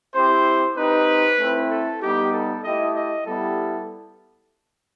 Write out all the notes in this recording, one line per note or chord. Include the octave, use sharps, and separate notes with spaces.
C4 E4 G4 C5
C4 D#4 G4 B4
A3 C4 E4
A4
G3 B3 D#4 G4
A4
A3 E4 G4 D#5
D#5
G3 B3 E4 G4 A4